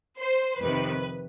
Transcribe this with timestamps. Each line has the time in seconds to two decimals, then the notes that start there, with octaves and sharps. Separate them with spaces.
0.20 C5
0.60 F2 C3 D#3 B4